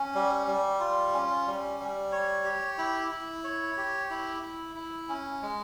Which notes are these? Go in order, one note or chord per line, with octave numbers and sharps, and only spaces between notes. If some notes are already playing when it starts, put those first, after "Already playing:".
Already playing: C#4
G3
G3
F4
C#4
G3
G3
C#5
G4
E4
E4
C#5
G4
E4
E4
E4
C#4
G#3